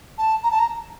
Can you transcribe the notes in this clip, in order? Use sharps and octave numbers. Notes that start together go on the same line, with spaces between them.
A5
A#5
A5
A#5